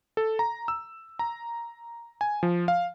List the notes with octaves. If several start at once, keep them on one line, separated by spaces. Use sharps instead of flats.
A4
A#5
E6
A#5
G#5
F3
F5